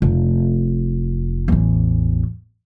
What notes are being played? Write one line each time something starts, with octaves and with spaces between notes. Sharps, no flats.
F1
A1 E2